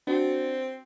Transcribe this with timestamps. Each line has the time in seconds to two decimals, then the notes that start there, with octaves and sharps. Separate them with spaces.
0.07 C4 D4 F#4